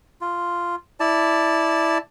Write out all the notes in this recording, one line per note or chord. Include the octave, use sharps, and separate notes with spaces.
F4
E4 D5 A5